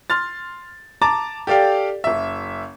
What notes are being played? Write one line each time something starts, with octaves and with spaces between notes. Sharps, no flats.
C6 F6 A6
A5 A#5 D6 A6
G4 A4 D5 F5 G5
F#1 E5